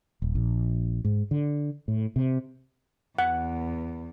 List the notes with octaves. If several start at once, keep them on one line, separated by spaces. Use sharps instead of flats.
D#1
A#1
G#2
D3
A2
C3
E2 F#5